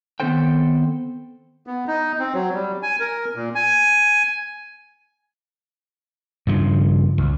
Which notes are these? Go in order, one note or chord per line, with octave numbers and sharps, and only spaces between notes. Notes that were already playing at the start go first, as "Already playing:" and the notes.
D#3 B3 C4 A4 C5 G5
B3
D#4
C4
F#3
G3
G#5
A#4
A#2
G#5
G2 C#3 F3
C#2